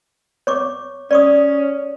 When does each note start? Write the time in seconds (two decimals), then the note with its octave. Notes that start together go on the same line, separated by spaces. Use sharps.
0.47 C#5 C#6 D6
1.11 C#4 D5 C#6 D#6